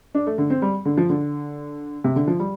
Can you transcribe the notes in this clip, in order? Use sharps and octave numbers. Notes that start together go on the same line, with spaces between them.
D4
A3
D3
C4
G3
D3
F3
D3
C3
D3
F3
G3